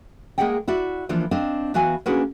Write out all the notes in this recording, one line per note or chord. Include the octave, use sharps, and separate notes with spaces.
G#3 A#3 G#4 D#5 F#5 G5
E4 F#4 D5 E5
E3 F3 A#3 D4 F4 C5
C4 D4 D#5 F5
E3 B3 F#4 F5 G#5
A#3 C#4 D4 F#4 G#4 B4